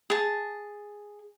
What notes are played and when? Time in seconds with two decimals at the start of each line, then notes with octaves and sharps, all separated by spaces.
0.10 G#4 A5